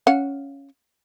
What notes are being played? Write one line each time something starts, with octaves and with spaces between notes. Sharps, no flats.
C#4 F5 F#5